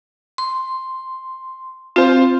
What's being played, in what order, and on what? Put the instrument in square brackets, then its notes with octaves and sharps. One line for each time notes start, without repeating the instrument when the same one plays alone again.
[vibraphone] C6
[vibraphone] C4 [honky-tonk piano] F4 C5